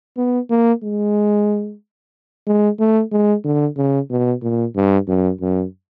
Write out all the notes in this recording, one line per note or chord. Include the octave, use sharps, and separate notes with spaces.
B3
A#3
G#3
G#3
A3
G#3
D3
C#3
B2
A#2
G2
F#2
F#2